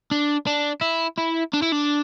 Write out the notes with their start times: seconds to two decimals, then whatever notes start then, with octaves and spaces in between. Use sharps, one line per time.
0.11 D4
0.47 D4
0.81 E4
1.18 E4
1.53 D4
1.62 E4
1.72 D4